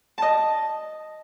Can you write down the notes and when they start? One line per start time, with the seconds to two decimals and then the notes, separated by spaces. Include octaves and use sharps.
0.18 D#5 A5